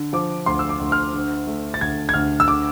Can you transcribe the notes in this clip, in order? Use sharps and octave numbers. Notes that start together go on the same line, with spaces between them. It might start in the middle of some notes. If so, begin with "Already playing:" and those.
Already playing: D3
F3 D6
D2 C6
E6
D6
D2
F6
D3
A3
A6
D2 G#6
G#6
D2 F6
E6
D3 D6